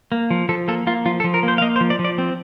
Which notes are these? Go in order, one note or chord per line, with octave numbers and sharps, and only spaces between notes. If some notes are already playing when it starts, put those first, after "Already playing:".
A#3
F3
F3 A4
A#3 A4
A#3 F4
F3 F4
A4
F3
A#4
A#3 C5
F5
A#3 D#5
C5
F3
D5
F3
D5
C4